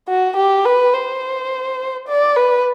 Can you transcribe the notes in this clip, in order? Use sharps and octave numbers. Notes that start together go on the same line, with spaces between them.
F#4
G4
B4
C5
D5
B4